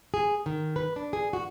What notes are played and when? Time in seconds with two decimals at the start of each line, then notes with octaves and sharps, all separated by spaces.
0.14 G#4
0.46 D#3
0.76 B4
0.96 D4
1.13 G#4
1.33 F#4